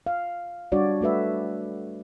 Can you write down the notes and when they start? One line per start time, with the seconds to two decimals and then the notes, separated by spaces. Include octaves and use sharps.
0.07 F5
0.72 G3 D4 F#4 C#5 D5
1.01 A3 F#4 B4 E5